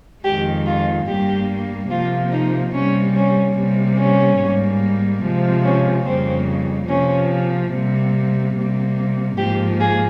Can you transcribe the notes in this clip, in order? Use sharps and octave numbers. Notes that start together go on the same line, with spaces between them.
F2 D#3 G#3 G4
F4
G2 G3 A#3 G4
C3 F3 A#3 F4
D#4
C3 G3 A#3 C#4
C#4
C3 G3 A#3
C#4
G#2 G3 A#3
C3 F3 G#3
C#4
F2 C#3 G3 A#3 C4
C3 F3 A#3 C#4
C3 G3 A#3
C3 G3 A#3
G#2 F3 A#3 G4
G#4